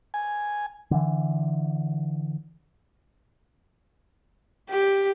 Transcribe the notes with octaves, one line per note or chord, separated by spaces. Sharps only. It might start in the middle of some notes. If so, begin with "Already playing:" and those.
G#5
D3 E3
G4